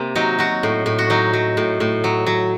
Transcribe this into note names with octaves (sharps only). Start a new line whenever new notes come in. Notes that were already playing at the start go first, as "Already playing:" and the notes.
Already playing: C3 A#3 C4
F#3 D#4
F#3 F#4
A2
A2
F#4
F#3 D#4
F#3
A2
A2
F#3
F#3